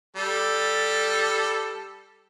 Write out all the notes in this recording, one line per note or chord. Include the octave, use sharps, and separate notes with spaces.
G3 A4